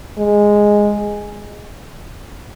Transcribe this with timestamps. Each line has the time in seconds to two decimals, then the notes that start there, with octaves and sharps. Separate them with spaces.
0.18 G#3